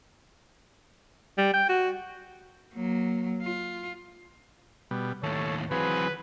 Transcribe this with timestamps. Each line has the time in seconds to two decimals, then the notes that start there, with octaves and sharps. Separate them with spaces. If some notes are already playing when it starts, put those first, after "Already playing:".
1.38 G3
1.54 G5
1.68 F#4
2.73 F#3 A#3
3.42 F4
4.91 B2 G3
5.23 D#2 A2 A4 C#5
5.71 E3 F#3 C4 G#4 B4 B5